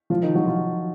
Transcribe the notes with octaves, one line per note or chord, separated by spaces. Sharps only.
F3 F4
D#3 D#4
F#3 F#4
F3 F4